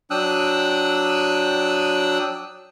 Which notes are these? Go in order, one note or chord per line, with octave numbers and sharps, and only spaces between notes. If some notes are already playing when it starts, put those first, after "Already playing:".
F#3 D4 G5 D#6 E6 F#6